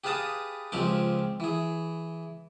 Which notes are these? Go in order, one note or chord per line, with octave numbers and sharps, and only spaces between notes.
G4 G#4 B4 F5 A5 D#6
C#2 F3 G#3 C4 G4 D6
E3 G#4